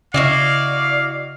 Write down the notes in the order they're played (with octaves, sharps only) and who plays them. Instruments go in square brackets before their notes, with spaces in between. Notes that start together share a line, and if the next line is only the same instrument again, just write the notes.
[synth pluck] C#3 [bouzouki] E4 F#4 D#5 [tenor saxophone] D5 [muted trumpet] F5